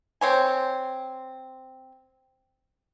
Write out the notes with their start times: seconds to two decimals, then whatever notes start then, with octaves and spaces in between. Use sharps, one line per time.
0.21 C4 C#5 G#5